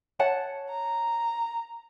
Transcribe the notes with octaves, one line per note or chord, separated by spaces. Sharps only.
C#5 F#5 A5
A#5